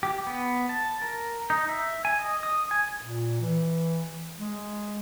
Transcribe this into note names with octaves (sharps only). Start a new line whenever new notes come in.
G4
B3
A5
A#4
D#4
E5
G#5
D#5
D#6
G#5
A#2
E3
G#3